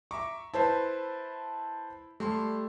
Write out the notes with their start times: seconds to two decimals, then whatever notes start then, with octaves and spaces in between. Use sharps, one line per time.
0.11 E5 A#5 C#6 D6
0.54 E4 B4 C5 A5
2.20 G3 A3 A5 C6